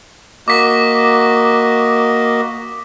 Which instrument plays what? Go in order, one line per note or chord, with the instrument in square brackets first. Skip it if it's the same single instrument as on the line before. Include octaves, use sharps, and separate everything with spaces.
[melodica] A#3 F#4 D#5 [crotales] D6 B6